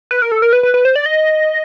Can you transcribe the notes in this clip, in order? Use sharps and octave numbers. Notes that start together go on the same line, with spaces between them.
B4
A#4
A4
A#4
B4
B4
B4
C5
D5
D#5